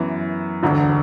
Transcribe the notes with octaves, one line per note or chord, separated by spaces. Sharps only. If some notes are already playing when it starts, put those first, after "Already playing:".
Already playing: F#2 E3 B3
E1 D2 D3